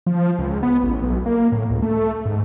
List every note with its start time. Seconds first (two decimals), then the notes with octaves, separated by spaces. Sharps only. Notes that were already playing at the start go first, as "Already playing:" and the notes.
0.07 F3
0.39 C#2
0.63 B3
0.83 A1
1.03 B1
1.26 A#3
1.52 A2
1.70 C#2
1.82 A3
2.26 G#2